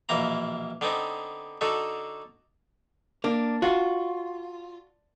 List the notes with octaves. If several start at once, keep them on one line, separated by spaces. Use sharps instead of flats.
A#1 B2 E3 A#3 A#5
D3 B3 C4 D#4
D3 D#4 F#4 A4
A#3 D4
F4 F#4